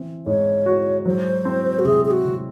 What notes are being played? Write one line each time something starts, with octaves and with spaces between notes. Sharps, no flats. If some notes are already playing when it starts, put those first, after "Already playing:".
Already playing: E3 C4
G#2 C#5
F#4
F#3 C5
C4
F#4
C3 G#4
G#4
F#4
C3